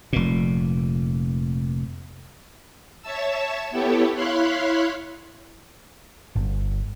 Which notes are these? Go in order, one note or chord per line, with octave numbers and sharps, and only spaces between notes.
F1 A#2
C#5 E5 A5 E6
B3 E4 G4 A4 C#5
E4 C#5 F5 B5 C6 F#6
G1